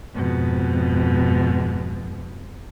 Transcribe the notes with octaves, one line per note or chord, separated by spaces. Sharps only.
F2 G#2 B2